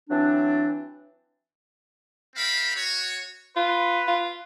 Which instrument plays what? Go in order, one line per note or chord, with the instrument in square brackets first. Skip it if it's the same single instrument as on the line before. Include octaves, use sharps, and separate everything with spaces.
[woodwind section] E3 F#3 C4 D4
[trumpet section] C4 A#4 E5 F5 G5 B5
F#4 C#5
[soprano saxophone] F4 [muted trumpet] B4
[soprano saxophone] F4